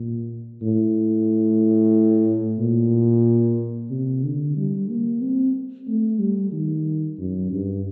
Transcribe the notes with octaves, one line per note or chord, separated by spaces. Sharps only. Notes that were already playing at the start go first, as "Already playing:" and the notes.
Already playing: A#2
A2
A#2
C3
D3
G3
A#3
C4
A3
G3
D#3
F#2
G2